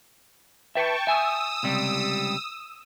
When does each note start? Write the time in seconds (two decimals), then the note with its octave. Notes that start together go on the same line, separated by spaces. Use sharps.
0.75 B4 E5 G5 A5 C#6
1.07 E5 G#5 D#6 E6
1.63 C#2 C3 G3